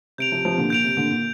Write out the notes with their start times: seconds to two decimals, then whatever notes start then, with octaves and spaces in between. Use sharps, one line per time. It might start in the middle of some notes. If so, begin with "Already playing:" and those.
0.18 C3 G6 D7 F7
0.31 C3 F3
0.45 C3 F3
0.58 A#2 D3
0.70 A#2 G6 D7 F7
0.84 C3
0.97 A#2 D3
1.10 A#2